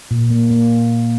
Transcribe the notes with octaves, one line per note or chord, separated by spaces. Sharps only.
A#2
A#3
A#3